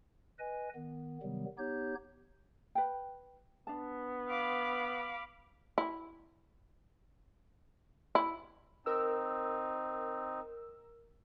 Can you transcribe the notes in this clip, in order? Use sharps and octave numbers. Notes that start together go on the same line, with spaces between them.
B4 D#5 G#5
D#3 B3
C3 D#3 F#3 G3 B3
B3 D#4 G4 C#5 G6
B4 G5
B3 D4 A5
F5 B5 D6
E4
E4
C4 D#4 A#4 E6